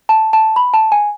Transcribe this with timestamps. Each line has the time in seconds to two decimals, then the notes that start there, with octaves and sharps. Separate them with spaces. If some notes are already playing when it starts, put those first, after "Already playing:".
0.09 A5
0.33 A5
0.56 B5
0.74 A5
0.92 G#5